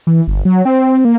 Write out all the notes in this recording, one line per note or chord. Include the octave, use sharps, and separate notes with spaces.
E3
G1
F#3
C4
A#3